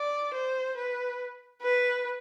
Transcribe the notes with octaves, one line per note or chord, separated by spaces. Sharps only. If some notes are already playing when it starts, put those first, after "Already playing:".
Already playing: D5
C5
B4
B4